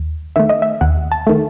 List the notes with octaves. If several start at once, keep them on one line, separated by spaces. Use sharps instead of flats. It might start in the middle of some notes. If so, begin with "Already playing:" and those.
Already playing: D#2
D#3 A3 E5
D#5
E5
D#2 F#5
A5
D#3 A3